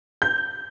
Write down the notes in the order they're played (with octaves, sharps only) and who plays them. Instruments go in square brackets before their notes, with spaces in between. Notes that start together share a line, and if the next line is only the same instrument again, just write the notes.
[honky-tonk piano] G6